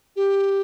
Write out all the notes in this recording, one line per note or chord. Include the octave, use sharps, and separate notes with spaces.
G4